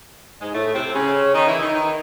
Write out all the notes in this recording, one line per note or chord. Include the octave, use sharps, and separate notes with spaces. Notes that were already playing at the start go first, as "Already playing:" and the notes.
G#2 G#3
A2 A3
C3 C4
C#3 C#4
D#3 D#4
E3 E4
D#3 D#4
D#3 D#4